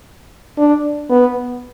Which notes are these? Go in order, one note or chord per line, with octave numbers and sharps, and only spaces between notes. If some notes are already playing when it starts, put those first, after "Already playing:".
D4
B3